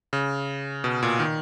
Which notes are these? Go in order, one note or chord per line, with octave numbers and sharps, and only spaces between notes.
C#3
B2
A#2
D#3